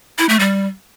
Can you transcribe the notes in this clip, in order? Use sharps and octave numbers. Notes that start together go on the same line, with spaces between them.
E4
A3
G3